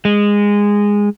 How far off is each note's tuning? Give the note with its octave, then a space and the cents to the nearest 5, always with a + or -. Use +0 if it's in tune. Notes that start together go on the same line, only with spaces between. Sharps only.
G#3 -15